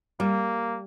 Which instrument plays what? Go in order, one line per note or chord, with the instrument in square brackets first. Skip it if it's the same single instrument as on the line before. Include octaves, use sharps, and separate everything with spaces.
[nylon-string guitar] G3 [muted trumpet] A#3